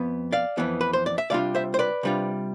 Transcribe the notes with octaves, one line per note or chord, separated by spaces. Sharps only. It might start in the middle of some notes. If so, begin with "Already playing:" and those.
Already playing: F2 B3
D5 F5
F2 E3 B3
B4
C5
D5
E5
C3 G3 D4 F4 D5 F5
C5 E5
C5
B4 D5
C3 G3 D4 F4